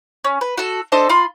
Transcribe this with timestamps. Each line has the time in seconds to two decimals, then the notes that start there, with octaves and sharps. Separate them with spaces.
0.24 C#4
0.41 B4
0.58 F#4 A4
0.92 D4 A4 C5 D#5
1.09 F4 B5 C6